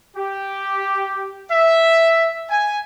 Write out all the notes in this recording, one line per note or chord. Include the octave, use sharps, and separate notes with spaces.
G4
E5
G#5